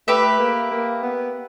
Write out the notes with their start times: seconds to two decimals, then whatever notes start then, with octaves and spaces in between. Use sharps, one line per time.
0.08 A3 G4 B4 E5
0.39 A#3
0.71 A#3
1.03 B3